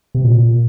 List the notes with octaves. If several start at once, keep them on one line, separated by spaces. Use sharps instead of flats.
C3
A#2